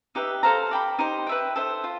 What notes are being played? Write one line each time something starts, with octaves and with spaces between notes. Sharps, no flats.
D#4 G4 B4 E5
A4 C5 F5 A#5
D5 G5 B5
D#4 G4 C5
B4 E5 G5
A4 C5 E5
F4